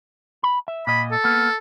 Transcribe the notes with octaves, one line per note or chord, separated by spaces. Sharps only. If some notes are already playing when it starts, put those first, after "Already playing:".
B5
E5
A#2 D#5 B5
A4
A#3 B3